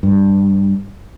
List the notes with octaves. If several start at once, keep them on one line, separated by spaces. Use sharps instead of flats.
G2